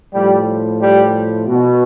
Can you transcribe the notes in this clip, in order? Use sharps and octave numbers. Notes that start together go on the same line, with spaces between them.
A2 F3 G3
G3
B2